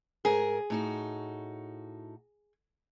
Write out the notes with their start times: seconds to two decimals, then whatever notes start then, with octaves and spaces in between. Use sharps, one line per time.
0.25 G#2 G#4 A#4
0.70 A2 D#4 F#4